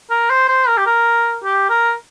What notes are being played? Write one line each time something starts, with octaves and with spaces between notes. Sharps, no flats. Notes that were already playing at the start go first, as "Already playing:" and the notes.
A#4
C5
C5
A#4
G4
A#4
G4
A#4